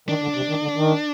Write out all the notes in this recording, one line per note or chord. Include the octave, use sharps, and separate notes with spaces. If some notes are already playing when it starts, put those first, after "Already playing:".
D#3 D4
D3
C3
D#3
D3
D#3